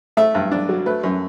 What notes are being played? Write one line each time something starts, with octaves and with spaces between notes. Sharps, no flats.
A3 E5
G2
D4
F#3
A3 B4
F#2